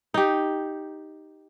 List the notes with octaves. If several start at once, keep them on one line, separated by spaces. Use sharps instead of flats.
D#4 G4